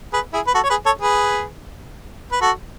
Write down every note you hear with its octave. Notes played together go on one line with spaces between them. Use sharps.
G#4 B4
E4 G#4
B4
F#4 A4
C#5
G#4 B4
A4 C#5
G#4 B4
B4
F#4 A4